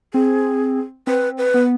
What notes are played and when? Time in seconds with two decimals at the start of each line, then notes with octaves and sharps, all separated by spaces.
0.14 C4 G#4
1.07 C4 B4
1.38 B4
1.54 B3